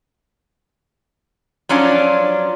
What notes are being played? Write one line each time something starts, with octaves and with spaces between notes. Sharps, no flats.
F3 F#3 C#4 D4 F4